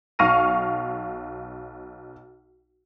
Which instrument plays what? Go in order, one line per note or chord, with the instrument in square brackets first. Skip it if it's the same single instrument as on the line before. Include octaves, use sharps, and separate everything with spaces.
[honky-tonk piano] B1 F5 C#6 F6 A#6 D#7